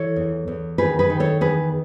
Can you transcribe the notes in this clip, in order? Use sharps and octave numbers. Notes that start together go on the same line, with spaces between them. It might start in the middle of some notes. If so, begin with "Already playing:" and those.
Already playing: E3 A4 C#5
E2
E2
D#3 G#4 B4
G#4 B4
D#3
A4 C#5
E2 G#4 B4